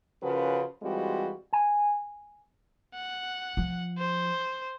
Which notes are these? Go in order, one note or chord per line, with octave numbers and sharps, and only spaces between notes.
C#3 F3 C#4 F#4 A#4 B4
E3 G3 G#3 C4 F4 F#4
G#5
F#5
F3
C5